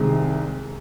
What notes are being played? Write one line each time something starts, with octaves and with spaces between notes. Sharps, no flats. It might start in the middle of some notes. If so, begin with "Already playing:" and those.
Already playing: C2 C3 D#3 G#3